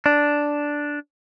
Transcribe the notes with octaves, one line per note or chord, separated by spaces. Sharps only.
D4